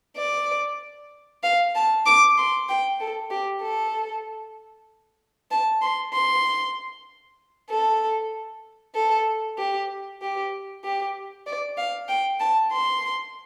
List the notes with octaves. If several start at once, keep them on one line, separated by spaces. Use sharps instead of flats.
D5
F5
A5
D6
C6
G5
A4
G4
A4
A5
C6
C6
A4
A4
G4
G4
G4
D5
F5
G5
A5
C6